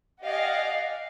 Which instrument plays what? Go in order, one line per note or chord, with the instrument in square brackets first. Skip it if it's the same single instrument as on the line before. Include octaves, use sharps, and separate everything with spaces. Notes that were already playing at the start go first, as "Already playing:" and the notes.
[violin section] G4 D5 D#5 F5 F#5 G#5